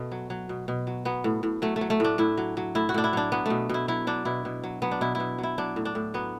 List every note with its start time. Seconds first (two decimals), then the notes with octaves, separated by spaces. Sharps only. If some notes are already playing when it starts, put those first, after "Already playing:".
Already playing: B2 A3
0.12 F#3
0.30 F#3
0.49 B2
0.68 B2
0.87 F#3
1.05 F#3 B3
1.24 A2
1.43 A2
1.62 F#3 A3
1.76 A3
1.81 F#3
1.90 A3
2.00 A2 D4
2.18 A2 E4
2.37 F#3
2.57 F#3
2.75 A2 E4
2.89 F#4
2.94 A2 D4
3.04 E4
3.13 F#3 D4
3.32 F#3 B3
3.46 B2 A3
3.69 B2 E4
3.88 F#3 E4
4.07 F#3 D4
4.25 B2 E4
4.45 B2
4.64 F#3
4.82 F#3 B3
4.91 D4
5.01 B2 E4
5.15 E4
5.20 B2
5.39 F#3 E4
5.58 F#3 D4
5.76 A2
5.85 D4
5.95 A2
6.14 F#3 B3